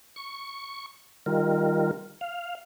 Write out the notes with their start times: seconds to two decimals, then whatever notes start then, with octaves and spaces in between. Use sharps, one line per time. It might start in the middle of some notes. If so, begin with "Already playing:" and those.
0.16 C#6
1.26 D#3 G3 F4 A#4
2.21 F5